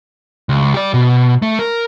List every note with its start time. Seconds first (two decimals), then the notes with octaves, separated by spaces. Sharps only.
0.49 C#2
0.74 G4 D5
0.94 B2
1.42 A3
1.59 A#4